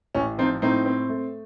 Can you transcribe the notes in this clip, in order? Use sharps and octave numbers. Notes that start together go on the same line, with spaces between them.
A1 C#4
F3 C4 D#4
A2 C4 D#4
C4
A3